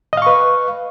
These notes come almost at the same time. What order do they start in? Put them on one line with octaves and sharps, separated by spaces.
D#5 F5 C#6 B4